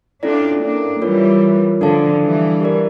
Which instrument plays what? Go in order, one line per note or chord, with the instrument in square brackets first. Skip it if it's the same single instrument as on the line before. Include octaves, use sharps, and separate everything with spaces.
[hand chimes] C#4 E4 A4 D5 [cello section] D4 F4
[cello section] A#3 D4
[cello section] E3 G3 [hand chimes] F4 A#4 C#5
[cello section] D3 F3 [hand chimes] D4 A4 D5 F5 A5
[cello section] E3 G3
[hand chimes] G4 A#4 D5